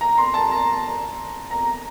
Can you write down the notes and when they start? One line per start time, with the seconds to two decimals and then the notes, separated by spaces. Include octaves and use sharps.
0.01 A#5
0.18 C6
0.34 A5
0.51 A#5
1.51 A#5